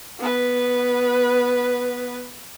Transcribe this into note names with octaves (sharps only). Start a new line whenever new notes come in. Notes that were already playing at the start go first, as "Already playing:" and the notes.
B3 B4